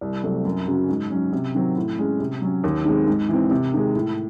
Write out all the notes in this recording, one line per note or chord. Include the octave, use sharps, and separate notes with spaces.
C2
C3 F#3 A3 C4
F#2
C#3 F#3 C#4 F#4
G#2
F#3 C#4
C3
D#3 F#3 C4
A2
G#3 C#4
C3
F#3 C#4
D#2
D#3 G#3 C4
G#2
E3 C4
C3
D#3 G#3
A2